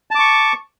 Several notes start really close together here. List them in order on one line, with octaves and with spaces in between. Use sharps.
A5 D6 C#6